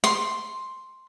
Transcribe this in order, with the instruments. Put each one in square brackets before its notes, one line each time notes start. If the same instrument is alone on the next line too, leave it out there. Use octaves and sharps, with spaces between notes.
[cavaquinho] C6